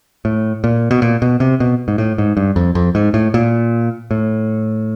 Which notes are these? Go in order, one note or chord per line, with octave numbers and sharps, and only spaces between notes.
A2
A#2
B2
A#2
B2
C3
B2
G#2
A2
G#2
G2
F2
F2
G#2
A2
A#2
A2